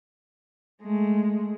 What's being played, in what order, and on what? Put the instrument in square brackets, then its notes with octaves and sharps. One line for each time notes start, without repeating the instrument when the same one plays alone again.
[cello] G#3 A3